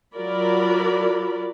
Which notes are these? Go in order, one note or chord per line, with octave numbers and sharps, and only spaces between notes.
F#3 F4 F#4 A#4 D5 B5